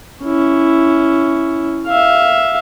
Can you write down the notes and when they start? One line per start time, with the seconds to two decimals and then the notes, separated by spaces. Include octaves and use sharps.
0.24 C#4 E4
1.87 E5 F5